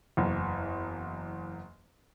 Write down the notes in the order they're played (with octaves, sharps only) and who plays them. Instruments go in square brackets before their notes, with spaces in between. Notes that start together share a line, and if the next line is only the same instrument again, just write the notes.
[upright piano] F#1 E2